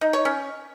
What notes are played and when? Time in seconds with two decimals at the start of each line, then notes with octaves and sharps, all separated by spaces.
0.01 D#4
0.13 C#5
0.25 C#4